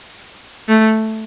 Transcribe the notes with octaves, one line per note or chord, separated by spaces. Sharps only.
A3